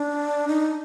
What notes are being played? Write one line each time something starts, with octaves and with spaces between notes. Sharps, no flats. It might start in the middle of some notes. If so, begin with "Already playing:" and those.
Already playing: D4
D#4